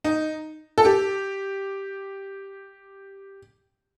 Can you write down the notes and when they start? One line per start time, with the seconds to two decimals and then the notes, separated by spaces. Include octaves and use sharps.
0.04 D#4
0.78 A4
0.85 G4